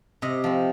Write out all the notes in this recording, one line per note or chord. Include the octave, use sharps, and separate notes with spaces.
C3 D#5
F3 C4